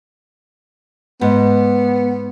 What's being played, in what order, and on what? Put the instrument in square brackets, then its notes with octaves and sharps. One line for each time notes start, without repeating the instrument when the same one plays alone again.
[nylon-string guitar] G#2 [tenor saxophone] B3